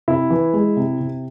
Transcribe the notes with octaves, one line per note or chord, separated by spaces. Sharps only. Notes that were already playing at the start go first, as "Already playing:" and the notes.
C3 E4
E3
G#3
C3
C3